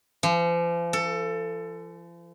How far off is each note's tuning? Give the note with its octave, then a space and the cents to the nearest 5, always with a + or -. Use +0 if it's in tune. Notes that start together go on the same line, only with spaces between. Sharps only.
F3 -40
A4 +20